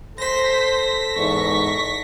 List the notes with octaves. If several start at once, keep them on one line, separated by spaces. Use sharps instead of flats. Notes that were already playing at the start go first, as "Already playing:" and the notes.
A4 C5 A#6 B6
E2 G#2 C#6